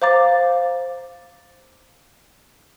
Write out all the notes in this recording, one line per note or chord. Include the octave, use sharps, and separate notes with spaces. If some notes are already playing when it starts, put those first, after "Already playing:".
C5 F5 A#5 D6 A6